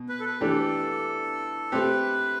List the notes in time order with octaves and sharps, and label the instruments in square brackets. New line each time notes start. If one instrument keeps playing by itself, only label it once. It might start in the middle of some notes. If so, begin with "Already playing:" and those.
Already playing: [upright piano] B2
[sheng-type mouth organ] B4
A4
B4
[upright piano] E3 A3 D4 G4 [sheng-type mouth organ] A4
[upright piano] A3 C4 G4 [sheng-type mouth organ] B4